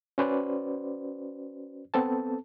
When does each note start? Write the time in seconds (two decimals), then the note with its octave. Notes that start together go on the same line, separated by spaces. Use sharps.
0.18 C#4 F#4 B4 C5 D5
1.94 B3 C4 A4 A5